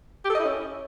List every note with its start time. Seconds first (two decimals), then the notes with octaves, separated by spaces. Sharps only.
0.25 G4
0.30 A4
0.35 D#5
0.40 E4
0.45 C#4